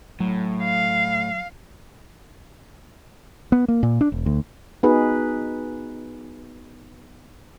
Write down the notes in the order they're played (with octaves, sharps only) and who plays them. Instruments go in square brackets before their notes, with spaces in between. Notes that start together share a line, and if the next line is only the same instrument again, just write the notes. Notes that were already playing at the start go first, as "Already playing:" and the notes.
[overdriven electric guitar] A2 [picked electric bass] F#3
[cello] F5
[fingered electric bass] B3
A#3
A#2
D4
E1
D2
[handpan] B3 D#4 F#4 G#4 B4